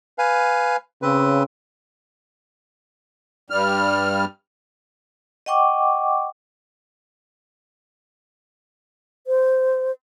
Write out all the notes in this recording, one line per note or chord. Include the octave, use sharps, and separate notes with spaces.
B4 F5 G#5
C#3 C4 B4
G2 G3 F6
D#5 F#5 G5 C#6 D6
C5